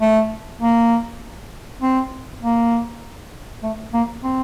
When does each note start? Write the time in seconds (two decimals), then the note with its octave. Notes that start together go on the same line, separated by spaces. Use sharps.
0.01 A3
0.61 A#3
1.82 C4
2.43 A#3
3.63 A3
3.94 A#3
4.24 C4